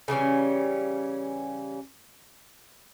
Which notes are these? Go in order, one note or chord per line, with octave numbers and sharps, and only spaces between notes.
C#3 E3 G3 C#4